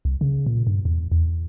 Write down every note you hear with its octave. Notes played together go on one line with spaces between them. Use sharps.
C2
C#3
A#2
G2
E2
E2